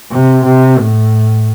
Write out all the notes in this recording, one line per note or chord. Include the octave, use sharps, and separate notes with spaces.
C3
C3
A2